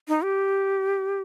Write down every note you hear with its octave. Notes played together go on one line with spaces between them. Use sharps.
D#4
G4